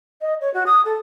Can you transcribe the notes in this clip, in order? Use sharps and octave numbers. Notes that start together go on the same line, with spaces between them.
D#5
C#5
F#4
D#6
A4